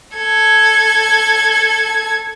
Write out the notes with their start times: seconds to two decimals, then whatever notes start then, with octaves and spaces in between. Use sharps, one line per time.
0.17 A4 G#6